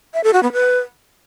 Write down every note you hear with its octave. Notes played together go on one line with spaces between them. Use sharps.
E5
A4
F#4
B3
B4